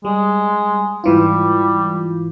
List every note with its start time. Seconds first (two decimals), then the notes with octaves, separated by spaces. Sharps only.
0.05 G3 G#3
1.04 G#2 E3 G3 F4